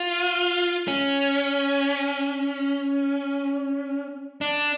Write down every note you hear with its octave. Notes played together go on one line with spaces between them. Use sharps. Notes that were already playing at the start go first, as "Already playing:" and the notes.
Already playing: F4
C#4
D4